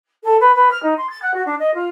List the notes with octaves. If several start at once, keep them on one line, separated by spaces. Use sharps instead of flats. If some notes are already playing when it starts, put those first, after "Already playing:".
A4
B4
B4
F6
D#4
C6
A6
F#5
F#4
D4
D#5
F4